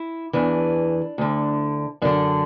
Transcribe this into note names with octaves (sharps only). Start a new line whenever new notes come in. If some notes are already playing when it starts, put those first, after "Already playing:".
Already playing: E4
E2 E3 D4
D2 D3
F#2 D3 D4